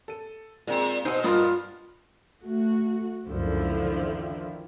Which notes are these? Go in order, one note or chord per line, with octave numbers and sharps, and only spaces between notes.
A4 D#7
A#2 G#3 C4 G#4
B2 C4 D#4 C5 F#5 G#5
G2 F4 A#4 B5 D#6
A3 F#4
C#2 F#2 A#2 D3 F3 E4
D#3